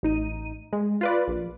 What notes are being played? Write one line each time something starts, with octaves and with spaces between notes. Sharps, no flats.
A1 D#4 D#7
G#3
F4 B4 D5
A#1